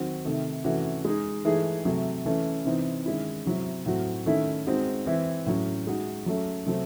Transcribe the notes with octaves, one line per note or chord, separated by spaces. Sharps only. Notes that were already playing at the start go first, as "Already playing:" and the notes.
Already playing: D#3 F#3 C4 F#4
C3 D#3 A3
C3 E3 A3 C#4 F#4
G#3 D#4 G#4
E3 A3 D#4 G#4
C3 F#3 A3
E3 A3 C#4
C3 E3 C4 D#4
D#3 G#3 C#4 E4
C3 F#3 C4 E4
A2 F#3 C4 F#4
D#3 A3 C#4 E4
G#3 C4 D#4 F#4
E3 C4 E4
A2 F#3 C#4
G#3 D#4 F#4
F#3 A3 C#4
C3 F#3 A3 C4